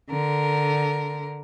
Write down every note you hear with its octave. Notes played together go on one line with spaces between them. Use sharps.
D3 A#4